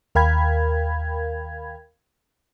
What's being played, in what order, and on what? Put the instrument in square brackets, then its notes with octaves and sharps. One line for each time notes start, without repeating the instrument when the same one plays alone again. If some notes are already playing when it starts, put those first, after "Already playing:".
[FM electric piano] D#2 A#4 F5 G5 B5 G#6